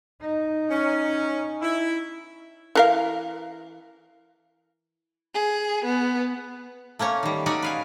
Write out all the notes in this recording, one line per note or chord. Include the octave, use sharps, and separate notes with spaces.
D#4
C#4
E4
E3 A#4 F5
G#4
B3
A3 A#3 C#4 C#5
D#3 G3
C#4 D#4 F#4 C#5 D5 G#5
B4 F5 G#5